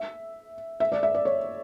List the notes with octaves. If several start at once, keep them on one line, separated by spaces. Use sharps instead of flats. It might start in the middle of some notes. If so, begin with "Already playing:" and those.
Already playing: E5
E5
D5
E5
D5
C#5